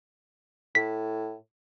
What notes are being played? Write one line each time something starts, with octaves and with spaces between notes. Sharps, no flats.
A2 B6